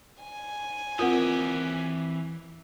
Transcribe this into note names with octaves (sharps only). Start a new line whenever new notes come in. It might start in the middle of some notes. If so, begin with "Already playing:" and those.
G#5
D#2 E3 C4 F4 G4 A#4 F#5